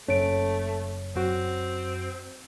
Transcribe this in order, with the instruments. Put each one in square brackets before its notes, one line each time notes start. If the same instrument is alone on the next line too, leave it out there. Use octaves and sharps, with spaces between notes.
[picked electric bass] F#1 C#4 [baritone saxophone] A3 [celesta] C#5 D7
[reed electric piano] F#2 F#4 [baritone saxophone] C4